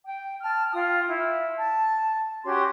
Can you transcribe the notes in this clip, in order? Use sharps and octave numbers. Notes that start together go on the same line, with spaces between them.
G5
A5 F6
F4 G5 D#6
E4
A5
C#4 F#4 G4 C6